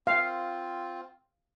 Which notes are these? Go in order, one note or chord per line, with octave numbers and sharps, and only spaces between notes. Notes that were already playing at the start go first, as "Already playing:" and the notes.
C4 F4 F5